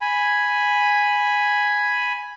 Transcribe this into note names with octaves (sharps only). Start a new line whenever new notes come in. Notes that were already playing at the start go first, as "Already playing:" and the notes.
G#5 B5